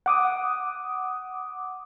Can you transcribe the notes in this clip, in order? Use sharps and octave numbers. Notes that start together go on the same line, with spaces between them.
F#5 D6 D#6